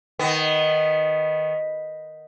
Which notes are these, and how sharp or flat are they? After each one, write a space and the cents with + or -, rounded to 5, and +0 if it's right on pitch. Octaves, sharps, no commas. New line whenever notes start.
D#3 +0 B3 +0